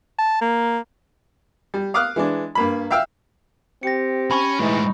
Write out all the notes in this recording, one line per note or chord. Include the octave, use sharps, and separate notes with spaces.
A5
A#3
G3
F5 D6 D#6 F6 F#6
E3 G#3 D4
G2 A#3 B5
E5 F5 G5 E6 F6
C4 G4 A#6 C#7
C#4 B5 C#6
A2 E3 G#3 D#4